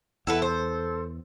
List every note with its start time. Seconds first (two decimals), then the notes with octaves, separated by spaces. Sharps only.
0.27 E2 E4 A4 B4 F#5
0.42 A4 C5